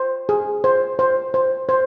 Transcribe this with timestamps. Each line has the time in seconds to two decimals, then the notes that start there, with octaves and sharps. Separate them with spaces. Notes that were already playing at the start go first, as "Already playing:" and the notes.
Already playing: C5
0.29 G#4
0.64 C5
0.99 C5
1.34 C5
1.69 C5